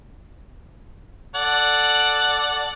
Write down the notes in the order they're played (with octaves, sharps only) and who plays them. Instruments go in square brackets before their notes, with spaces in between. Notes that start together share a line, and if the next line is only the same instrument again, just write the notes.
[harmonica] A4 D5 F#5